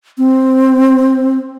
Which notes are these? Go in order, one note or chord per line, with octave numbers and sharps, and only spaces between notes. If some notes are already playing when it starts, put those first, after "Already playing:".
C4